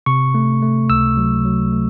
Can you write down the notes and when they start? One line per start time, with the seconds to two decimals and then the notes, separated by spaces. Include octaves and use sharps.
0.06 C3 C#6
0.34 A3
0.62 A3
0.90 C#2 E6
1.17 F#3
1.45 F#3
1.72 A3